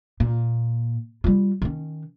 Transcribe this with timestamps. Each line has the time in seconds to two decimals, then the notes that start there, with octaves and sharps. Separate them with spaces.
0.20 A#2
1.24 G3 F4
1.62 D#3 C#4